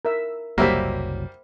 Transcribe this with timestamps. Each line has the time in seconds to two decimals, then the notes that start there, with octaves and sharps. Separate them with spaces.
0.05 A#4 E5 E6
0.58 F#1 C2 F#3 G3 A#3 C5 E5 F#5